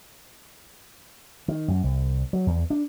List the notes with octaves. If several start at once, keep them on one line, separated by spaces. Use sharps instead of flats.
D#3
F#2
C2
F#3
E2
D4